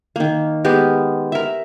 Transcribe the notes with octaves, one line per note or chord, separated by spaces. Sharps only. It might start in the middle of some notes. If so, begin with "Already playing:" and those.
D#3 A#3
G#3 B3 G4 A#4
A#4 E5